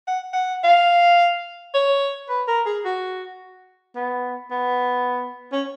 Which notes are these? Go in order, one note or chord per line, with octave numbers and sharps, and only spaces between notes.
F#5
F#5
F5
C#5
B4
A#4
G#4
F#4
B3
B3
C#4